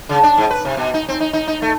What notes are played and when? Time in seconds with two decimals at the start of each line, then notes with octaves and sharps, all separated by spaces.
0.09 C#3
0.23 D4
0.38 G#2
0.51 B4
0.65 C3
0.77 B2
0.94 D#4
1.09 C4
1.20 D#4
1.33 D#4
1.48 D#4
1.62 A3